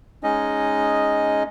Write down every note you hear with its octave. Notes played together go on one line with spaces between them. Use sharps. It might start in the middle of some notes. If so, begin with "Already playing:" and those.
G#3 C#4 D#4 D#5